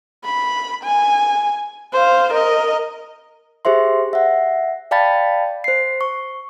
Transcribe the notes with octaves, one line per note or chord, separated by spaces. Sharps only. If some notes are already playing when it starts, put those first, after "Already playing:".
B5
G#5
C5 F5
A#4 D#5
G4 G#4 C5 E5 C6
E5 F#5
D5 F5 G5 A5 B5 A6
C5 C7
C#6